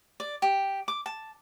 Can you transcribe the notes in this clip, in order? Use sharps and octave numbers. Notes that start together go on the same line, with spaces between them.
D5
G4
D6
A5